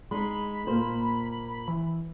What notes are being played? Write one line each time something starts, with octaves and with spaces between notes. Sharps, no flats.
G#3 D#4 B5
A#2 A#3 C5
E3